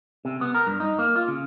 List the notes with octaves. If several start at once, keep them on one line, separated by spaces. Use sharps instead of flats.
C3
B3
A#4
G2
D#4
A#3
F4
C#3